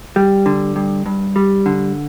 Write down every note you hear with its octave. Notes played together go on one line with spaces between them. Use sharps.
G3
D3
G2
G2
G3
D3